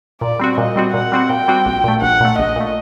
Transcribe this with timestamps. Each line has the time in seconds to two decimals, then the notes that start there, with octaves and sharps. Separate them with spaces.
0.21 A#2 D5
0.39 G3 C4 F#4
0.58 A#2 D#5
0.76 G3 C4 F#4
0.94 A#2 F#5
1.12 G3 C4 F#4
1.29 A#2 G5
1.48 G3 C4 F#4
1.66 A#1
1.84 A#2 A3
2.02 A#1 F#5
2.20 A#2 A3
2.39 A#1 D#5
2.56 A#2 A3